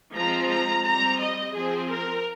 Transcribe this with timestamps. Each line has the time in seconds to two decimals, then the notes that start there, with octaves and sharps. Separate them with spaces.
0.15 F3 G#3 C4 A#5
0.50 A#5
0.86 G3 C4 A#5
1.20 D#5
1.55 F3 C4 G#4
1.90 A#4